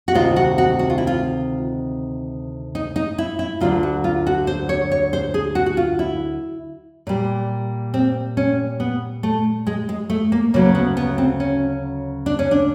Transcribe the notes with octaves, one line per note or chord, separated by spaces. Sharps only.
F#4
D2 C3 D#3 G#3 F4
F#4
F#4
F#4
F4
E4
F4
D#4
D#4
E4
E4
D2 D3 F#3 F4
F#4
F4
F#4
C5
C#5
C#5
C5
G#4
F#4
F#4
F4
E4
A#2 G3
C4
C#4
B3
A3
G#3
G#3
A3
A#3
D2 C#3 F#3 A#3
B3
B3
C4
C#4
D4
C#4
D4